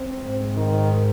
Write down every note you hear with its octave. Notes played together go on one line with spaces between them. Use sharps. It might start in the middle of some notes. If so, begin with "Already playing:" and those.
Already playing: C4
G#2
D#3